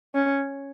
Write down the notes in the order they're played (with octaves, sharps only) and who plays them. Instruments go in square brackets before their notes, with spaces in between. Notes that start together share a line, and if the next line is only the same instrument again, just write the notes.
[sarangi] C#4